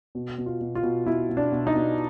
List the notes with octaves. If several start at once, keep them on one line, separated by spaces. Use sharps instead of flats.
B2
B2
F4
B2
F4
B2
B2 E4
B2
D4
B2
D#4
B2